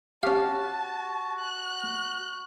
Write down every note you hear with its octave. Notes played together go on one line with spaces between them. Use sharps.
C#4 F#4 G4 F5 A5
F#6